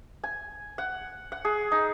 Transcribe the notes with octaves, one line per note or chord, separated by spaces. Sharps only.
G#5
F#5
F#5
G#4
D#4